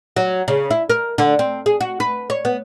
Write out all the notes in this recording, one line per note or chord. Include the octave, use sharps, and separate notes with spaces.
F#3
C#3
E4
A#4
D3
C4
G#4
F#4
B4
C#5
B3